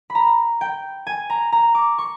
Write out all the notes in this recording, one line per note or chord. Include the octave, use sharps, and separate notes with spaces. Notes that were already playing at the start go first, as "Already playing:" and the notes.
B5
A#5
G5
G#5
A#5
A#5
D6
C#6